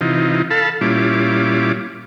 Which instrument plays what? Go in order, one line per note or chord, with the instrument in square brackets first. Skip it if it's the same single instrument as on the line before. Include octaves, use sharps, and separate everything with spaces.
[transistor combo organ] C3 E3 D#4 F4
A4 F5 A5 B5
A#2 G3 C#4 E4 F4 D6